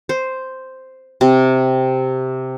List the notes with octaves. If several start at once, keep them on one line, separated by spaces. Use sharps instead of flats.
C5
C3